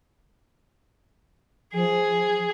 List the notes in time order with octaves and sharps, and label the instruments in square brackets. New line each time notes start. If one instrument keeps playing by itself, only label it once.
[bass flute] F3 [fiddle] G#4